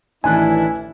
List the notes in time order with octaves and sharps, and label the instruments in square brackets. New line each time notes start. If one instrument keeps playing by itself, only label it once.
[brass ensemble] A1 E4 [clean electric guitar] D#3 E3 D4 [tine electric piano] G#5